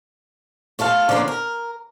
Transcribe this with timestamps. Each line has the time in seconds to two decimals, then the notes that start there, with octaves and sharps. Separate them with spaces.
0.79 A3 F4 A4 F5
1.09 D3 F3 A#3 C4 C#4
1.28 A#4